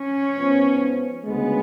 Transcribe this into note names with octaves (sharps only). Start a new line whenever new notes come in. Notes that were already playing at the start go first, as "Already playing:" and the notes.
Already playing: C#4
G#2 F3 B3
D2 C#3 G#3 B3